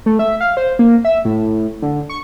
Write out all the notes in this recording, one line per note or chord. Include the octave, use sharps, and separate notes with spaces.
A3
E5
F5
C5
A#3
E5
A2
D3
C#6